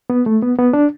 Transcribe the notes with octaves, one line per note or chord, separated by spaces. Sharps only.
B3
A3
B3
B3
D4